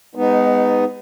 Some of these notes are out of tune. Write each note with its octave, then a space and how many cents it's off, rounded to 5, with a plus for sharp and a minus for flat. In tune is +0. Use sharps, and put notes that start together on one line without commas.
G#3 -25 B3 +15 D#4 +0